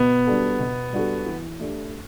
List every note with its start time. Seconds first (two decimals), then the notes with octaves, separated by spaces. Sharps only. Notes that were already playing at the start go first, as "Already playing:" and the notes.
Already playing: B2 B3
0.26 G3 D4 F#4 A4
0.59 B2
0.93 G3 D4 F#4 A4
1.26 E3
1.60 A3 D4 G4